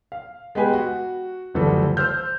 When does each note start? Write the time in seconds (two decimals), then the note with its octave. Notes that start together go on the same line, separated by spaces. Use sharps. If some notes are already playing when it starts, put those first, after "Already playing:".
0.12 F5
0.55 G#3 B3 G4 B4 G#5
0.73 F#4
1.54 F#1 D2 E3 F3 G3 A4
1.97 C5 E6 F6 G6